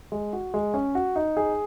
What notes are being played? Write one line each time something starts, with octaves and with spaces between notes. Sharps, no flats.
G#3
F#4
G#3
C#4
F#4
D#4
G#4